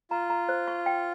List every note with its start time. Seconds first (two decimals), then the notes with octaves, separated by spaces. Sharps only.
0.11 F4 A#5
0.30 A#5
0.49 C5
0.68 C#6
0.86 G5